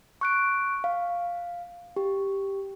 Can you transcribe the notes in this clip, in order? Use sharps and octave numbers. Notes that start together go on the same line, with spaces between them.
C#6 F#6 D7
F5
G4